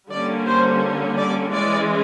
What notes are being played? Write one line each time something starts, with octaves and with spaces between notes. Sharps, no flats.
D3 G3 A#3 C#4 D5
C5
D5
E3 G#3 C#4 D5